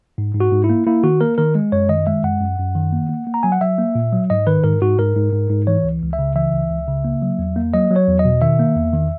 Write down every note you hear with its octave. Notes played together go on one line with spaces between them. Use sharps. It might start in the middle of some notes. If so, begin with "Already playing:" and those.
G#2
G#2
F#4
G#2
E4
A#3
A#3 E4
D#3 F#4
A#3 A#4
D#3 A#4
G#3
F#2 C#5
D#3 D#5
G#3 E5
F#2 F#5
F#2
F#2
D#3
A#3
A#3
A#3
A#5
F#3 G#5
F#5
F#3 E5
A#3
A#2
F#3
G#2 D#5
D#3 B4
G#2 A#4
G#2 F#4
G#2 A#4
G#2
G#2
G#2
E3 C#5
C#2
C#2
E5
C#3
E3 E5
C#2
C#2
C#3
A#3
F#3
E2
A#3
F#3 D#5
F#3
C#5
E2
D#5
B2
D#3 E5
A#3
E2
D#3